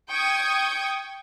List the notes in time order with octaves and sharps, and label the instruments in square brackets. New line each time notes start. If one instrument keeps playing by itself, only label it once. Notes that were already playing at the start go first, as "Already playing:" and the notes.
[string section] G5 C#6 D#6 G#6